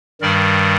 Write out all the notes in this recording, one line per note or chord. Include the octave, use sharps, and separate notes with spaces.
G2 D#3 G3 A#4 D5